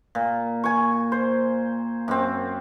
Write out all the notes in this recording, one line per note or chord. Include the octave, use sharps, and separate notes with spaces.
A#2
G#5 C#6
C5
F#2 C4